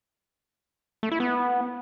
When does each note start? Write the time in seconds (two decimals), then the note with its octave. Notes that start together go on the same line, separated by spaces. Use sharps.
1.03 A3
1.11 E4
1.20 B3